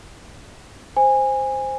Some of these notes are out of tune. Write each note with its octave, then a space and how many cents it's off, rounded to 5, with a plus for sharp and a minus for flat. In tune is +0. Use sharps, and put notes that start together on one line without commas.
C5 +0 G#5 -20